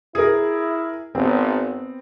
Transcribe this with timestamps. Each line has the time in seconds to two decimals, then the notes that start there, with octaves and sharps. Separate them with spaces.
0.15 E4 G#4 A#4
1.15 G#1 B3 C4